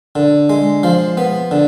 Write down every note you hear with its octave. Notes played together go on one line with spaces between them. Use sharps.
D3
G#3
F3
B3
D3